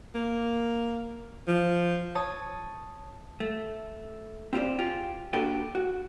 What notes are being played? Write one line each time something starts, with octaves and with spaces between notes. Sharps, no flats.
A#3
F3
C#5 A5 D#6
A3
C4 F4 G4 A#4 C5 D5
F4 G4 G#4
A#3 D4 F#4 G4 A4 B4
F#4